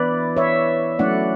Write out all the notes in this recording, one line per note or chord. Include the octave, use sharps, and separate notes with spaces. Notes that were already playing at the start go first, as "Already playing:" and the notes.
Already playing: E3 B3 E4 B4 D5
C#5 E5
F#3 A3 C#4 E4 D5 F#5